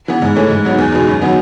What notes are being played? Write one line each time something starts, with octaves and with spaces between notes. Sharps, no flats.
E3 B3
G#2
E3 A3 C#4
G#2
F#3 B3 D#4
E2
B2 G#3 D#4
F#2
D#3 F#3 B3 D#4